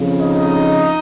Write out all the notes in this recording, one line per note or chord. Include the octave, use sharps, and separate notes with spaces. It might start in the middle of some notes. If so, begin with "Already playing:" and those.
Already playing: F2 C#3
D#4 D#5